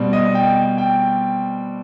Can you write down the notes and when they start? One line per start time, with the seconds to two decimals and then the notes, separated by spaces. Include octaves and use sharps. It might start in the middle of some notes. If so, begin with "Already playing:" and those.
Already playing: B2 G3 C4
0.13 D#5
0.35 G5
0.78 G5